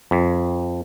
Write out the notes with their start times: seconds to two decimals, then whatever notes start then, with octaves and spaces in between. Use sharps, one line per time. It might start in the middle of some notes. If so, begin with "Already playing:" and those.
0.11 F2